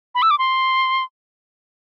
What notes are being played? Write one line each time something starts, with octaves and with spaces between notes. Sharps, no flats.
B5
E6
D6
C6